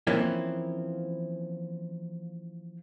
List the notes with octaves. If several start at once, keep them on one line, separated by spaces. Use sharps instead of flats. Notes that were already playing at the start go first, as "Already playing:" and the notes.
E3 F3 A#3 C4 C#4 E4